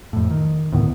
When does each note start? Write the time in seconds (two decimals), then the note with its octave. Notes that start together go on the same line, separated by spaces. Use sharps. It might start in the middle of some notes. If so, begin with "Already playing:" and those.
0.13 F2 A2
0.31 D#3
0.72 D2 A2 D#3 B3